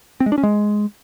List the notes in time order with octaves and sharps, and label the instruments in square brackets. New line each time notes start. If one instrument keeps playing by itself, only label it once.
[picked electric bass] C4
G#3
D4
C#4
G#3